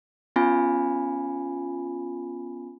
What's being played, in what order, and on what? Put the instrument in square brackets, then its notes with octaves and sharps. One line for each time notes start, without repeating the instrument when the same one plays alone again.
[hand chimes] B3 C#4 F4 G#5 B5